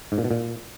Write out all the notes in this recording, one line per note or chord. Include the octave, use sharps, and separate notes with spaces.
G#2
A#2
B2
A#2